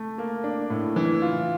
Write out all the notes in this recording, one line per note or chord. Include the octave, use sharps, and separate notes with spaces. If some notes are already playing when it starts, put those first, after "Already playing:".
Already playing: A3
A#3
D4
A2
E3
F4